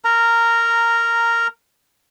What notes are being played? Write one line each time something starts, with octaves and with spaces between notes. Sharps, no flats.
A#4 A#5